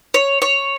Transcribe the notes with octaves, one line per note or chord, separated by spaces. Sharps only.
C#5
C#5